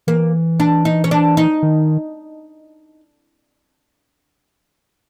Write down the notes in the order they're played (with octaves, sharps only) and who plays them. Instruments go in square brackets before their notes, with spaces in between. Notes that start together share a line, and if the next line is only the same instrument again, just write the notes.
[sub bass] E3 [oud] A#3
[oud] D4
D#4
C#4
D4
D#4
[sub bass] D#3